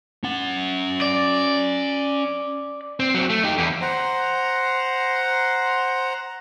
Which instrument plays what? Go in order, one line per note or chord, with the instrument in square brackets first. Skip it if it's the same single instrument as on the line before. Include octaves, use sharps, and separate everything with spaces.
[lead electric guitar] C#4 F#5
[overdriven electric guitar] D5
[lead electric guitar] C4
F#3 C4
A3
D#4 G4
E2
[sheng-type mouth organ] C5 F#5 A#5